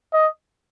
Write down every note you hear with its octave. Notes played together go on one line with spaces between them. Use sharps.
D#5